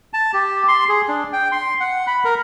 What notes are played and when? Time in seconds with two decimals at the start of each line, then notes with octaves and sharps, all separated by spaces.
0.13 A5
0.33 G4
0.68 C6
0.89 G#4
1.08 D4
1.33 G5
1.52 C6
1.80 F#5
2.07 B5
2.25 A#4